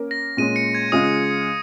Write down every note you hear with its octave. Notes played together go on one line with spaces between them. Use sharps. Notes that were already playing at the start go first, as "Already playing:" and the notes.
Already playing: A#3 C#4 A#4
A#6
A#2 G#3 C#4 D#7
C#7
G#6
C#3 G#3 F4 G#4 D#5 D#6